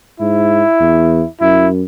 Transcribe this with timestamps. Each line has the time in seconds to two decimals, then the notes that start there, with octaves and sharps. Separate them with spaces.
0.20 G#2 E4
0.80 E2
1.41 F#2 E4